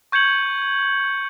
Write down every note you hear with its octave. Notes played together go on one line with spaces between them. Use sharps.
C#6 G6 G#6 C#7 F#7